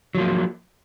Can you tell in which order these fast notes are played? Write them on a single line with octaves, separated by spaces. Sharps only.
F#3 F3 A#3